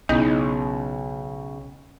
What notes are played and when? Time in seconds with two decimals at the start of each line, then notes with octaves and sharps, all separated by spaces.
0.09 B1 C#3 B3 D#4 E4